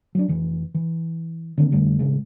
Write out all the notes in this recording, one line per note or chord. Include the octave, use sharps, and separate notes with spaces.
F#3 D4
F1 E3
E3
D3 D#3 A#3 C4
F1 D3 G3 A3
A1 C#3 G#3